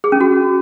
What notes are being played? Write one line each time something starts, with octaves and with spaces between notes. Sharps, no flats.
G#4
C#4
F#4